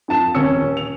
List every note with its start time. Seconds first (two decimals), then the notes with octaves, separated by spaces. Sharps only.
0.08 F2 F3 A5 E7
0.35 D#1 C#4 E6 C#7
0.77 F7